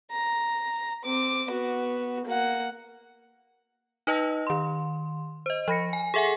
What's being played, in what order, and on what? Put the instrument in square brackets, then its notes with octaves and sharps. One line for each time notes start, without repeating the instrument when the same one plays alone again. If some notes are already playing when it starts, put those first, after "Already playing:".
[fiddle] A#5
C4 D6
B3 F#4
A#3 F#5
[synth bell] D#4 B4 D#5 A5 E6 A#6
D#3 C6
C5 D#5
F3 B5 A#6 C#7
G#5
G#4 A4 E5 F#5 G#5